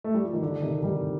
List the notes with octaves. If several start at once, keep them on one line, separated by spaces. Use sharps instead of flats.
A3
G3
F3
D#3
D3
C3 D#3
D#3 G3